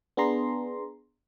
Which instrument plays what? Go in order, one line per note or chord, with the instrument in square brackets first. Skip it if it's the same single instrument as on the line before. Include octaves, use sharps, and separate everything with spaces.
[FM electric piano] B3 D4 G#4 A#5 C6